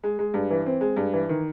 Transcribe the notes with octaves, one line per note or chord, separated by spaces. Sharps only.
G#3
G#3
G2
E3
C4
G#3
G2
E3
D#3